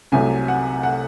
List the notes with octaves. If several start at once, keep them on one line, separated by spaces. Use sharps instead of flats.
C2 C3 F#3 A3 G#5
F#5
F#5